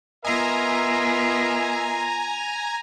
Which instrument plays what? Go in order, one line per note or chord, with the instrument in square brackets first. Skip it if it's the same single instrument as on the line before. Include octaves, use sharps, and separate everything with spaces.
[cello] B3 F4 [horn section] A#4 D#5 E5 [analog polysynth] G#5 A#5